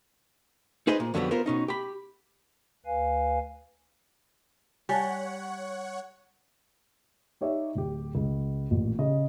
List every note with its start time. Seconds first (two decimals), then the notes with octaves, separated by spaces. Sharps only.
0.87 D#4 G#4 B4 C5 D#5
1.00 A#2
1.14 F2 D3 F#3 G3 B3
1.31 B3 F4 A#4 C5
1.46 B2 C#4 D#4
1.68 G4 B5
2.86 D2 B4 F5 G#5
4.89 G3 C#5 F#5 G#5 A5
7.41 D#4 G4 C#5 D5 E5
7.75 D1 G4
8.15 C#2
8.71 A1 A#2
8.99 C#3 G4 D#5